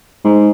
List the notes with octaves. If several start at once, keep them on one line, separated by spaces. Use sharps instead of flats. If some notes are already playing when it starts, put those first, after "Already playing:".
G#2